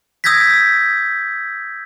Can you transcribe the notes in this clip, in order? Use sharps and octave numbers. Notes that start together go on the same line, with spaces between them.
D#6 E6 G6 G#6 A#6 B6